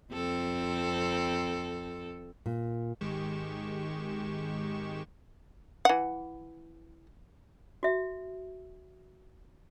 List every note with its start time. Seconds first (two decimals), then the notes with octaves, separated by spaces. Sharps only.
0.13 F2 C4 A4
2.46 A#2
3.01 G#1 D#3 G#3 G4 C#6 E7
5.85 E3 F#5
7.83 F#4 E5